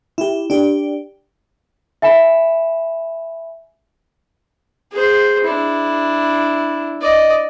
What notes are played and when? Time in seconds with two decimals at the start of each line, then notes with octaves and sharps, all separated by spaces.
0.18 E4 G4
0.50 D4 G4
2.02 E5 G#5 B5 E7
4.92 G#4 C5
5.44 D4 E4
7.01 D5 D#5